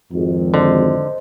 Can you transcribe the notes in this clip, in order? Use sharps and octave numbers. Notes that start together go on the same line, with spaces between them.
G#1 F2
D3 C5 D#5